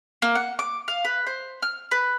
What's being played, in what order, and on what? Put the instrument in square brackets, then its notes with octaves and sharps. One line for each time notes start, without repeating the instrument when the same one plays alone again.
[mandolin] A#3
F#5
D6
F5
B4
C5
F6
B4